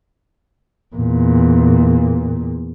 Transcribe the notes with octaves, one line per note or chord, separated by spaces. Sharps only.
E2 A#2